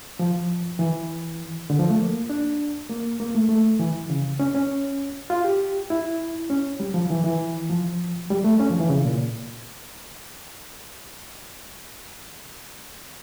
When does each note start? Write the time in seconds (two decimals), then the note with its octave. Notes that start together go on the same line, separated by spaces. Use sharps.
0.19 F3
0.79 E3
1.70 D3
1.79 F3
1.90 A3
1.99 A#3
2.29 D4
2.89 A#3
3.20 A#3
3.35 A3
3.49 A3
3.79 E3
4.10 C#3
4.40 C#4
4.55 C#4
5.30 F4
5.44 G4
5.90 E4
6.50 C#4
6.80 G3
6.94 F3
7.10 E3
7.25 E3
7.70 F3
8.30 G3
8.44 A3
8.60 C#4
8.70 F3
8.80 E3
8.89 C#3
9.05 A#2